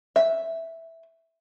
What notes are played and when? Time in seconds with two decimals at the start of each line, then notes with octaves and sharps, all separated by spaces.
0.16 E5